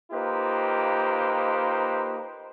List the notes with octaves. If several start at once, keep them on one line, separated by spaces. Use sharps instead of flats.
A#3 D#4 F4 G4 B4 C5